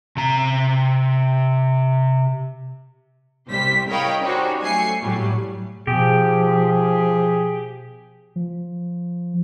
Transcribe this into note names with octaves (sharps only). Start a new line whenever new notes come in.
C3 A#5
C2 G3 C5 B6
A#4 C#5 D#5 F5 G5 B5
G3 C#4 D#4 F#4 C5
F#3 A3 G#5 C7 C#7
A2 F#3 G3
B2 F3 G4 G#4
F3